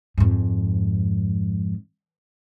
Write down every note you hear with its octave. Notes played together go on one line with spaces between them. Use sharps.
F2 G#2